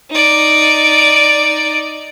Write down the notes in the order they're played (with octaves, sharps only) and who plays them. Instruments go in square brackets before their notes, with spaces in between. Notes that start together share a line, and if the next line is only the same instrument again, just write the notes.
[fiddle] D#4 D5